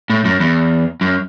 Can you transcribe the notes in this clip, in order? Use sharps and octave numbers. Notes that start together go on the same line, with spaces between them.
A2
F#2
E2
F#2